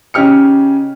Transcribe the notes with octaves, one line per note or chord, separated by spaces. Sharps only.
C#3 C#4 D#4 G4 F6 C#7